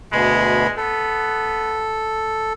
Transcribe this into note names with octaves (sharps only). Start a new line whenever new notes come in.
D2 B2 G#3 B5
B3 A4